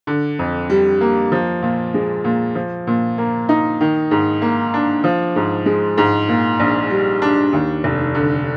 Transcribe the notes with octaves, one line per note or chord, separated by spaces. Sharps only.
D3
F2
G3
A#3
F3
A#2
G#3
A#2
F3
A#2
A#3
D#4
D#3
G#2
A#3
D4
F3
G#2
G#3
G#2
A#2
A#1
G3
D4
D#2
F1
D3